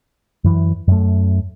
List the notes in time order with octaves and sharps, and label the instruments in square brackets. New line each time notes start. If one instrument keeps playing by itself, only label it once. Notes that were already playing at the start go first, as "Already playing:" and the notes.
[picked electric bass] F#2 E3
F#2 A3